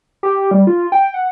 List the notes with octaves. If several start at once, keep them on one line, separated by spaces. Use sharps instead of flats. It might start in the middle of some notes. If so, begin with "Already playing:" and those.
G4
G3
F4
G5
F#5